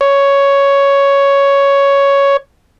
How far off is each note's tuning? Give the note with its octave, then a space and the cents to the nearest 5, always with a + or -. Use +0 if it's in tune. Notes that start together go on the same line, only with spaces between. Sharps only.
C#5 +5